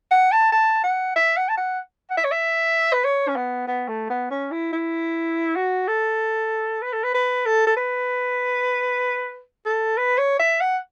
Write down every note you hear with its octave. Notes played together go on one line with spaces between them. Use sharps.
F#5
A5
A5
F#5
E5
F#5
A5
F#5
F#5
E5
C#5
E5
B4
C#5
C#4
B3
B3
A3
B3
C#4
E4
E4
F#4
A4
B4
A4
B4
B4
A4
A4
B4
A4
B4
C#5
E5
F#5